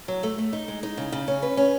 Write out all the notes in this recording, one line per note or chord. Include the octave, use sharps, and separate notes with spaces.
F#3
A3
A3
D#4
G#3
D#4
C#3
C#3
C#4
B4
C#4